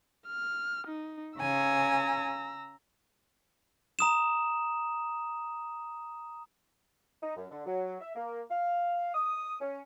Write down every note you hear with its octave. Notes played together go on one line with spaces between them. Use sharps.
F6
D#4
C#3 G#5 A#5 E6
A#5 D#6 E7
D#4
F#2
D3
F#3
E5
A#3
F5
D#6
C#4